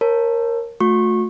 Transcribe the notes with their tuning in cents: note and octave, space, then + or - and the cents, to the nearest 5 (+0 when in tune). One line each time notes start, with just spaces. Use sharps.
A#4 +0 C#5 -30 A5 +0
A3 +0 F#4 -45 C#6 -25